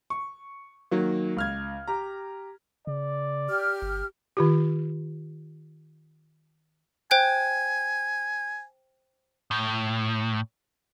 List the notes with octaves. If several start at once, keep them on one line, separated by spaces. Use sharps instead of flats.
C#6
D#3 F#3 A#3
C#2 F6 G#6
G4 A#5
C#3 D5
G4 F6
G1
D#3 F4 G4
C5 G5 G#5 F#6
A2